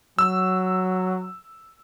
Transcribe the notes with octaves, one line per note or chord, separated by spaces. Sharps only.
F#3 E6